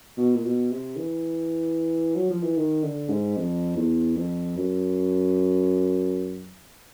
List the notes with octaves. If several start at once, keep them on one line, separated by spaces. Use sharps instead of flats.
B2
A#2
B2
C3
E3
F#3
F3
E3
D#3
D3
G#2
F2
E2
F2
F#2